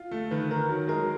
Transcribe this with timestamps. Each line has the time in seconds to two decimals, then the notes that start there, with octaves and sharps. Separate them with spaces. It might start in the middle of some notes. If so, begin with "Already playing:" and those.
Already playing: F4
0.11 A3
0.31 D#3 B4
0.50 D#3 A#4
0.69 F#3
0.88 G#3 A#4